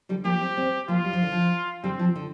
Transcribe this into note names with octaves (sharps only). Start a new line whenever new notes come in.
D3 G3
F3 A#3 G4
G3 C4
G3 C4
F3 A#3 F4
G3
F3
D3
F3
D3 G3 C4
F3
D3